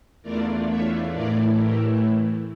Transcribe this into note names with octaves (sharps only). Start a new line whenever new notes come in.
E2 E3 A3 D4 F4 A#4 D5
C#5 E5
A2 E3 A3 E4 A#4 D5
G4 A#4